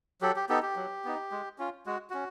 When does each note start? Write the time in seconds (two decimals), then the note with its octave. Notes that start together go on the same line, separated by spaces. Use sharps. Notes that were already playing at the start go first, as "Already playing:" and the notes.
0.21 F#3 G4 A4
0.36 G4
0.49 B3 D#4 G4 A4
0.62 G4
0.76 F#3
1.05 B3 D#4
1.31 G#3
1.59 C#4 F4
1.86 G#3 F#4
2.10 C#4 F#4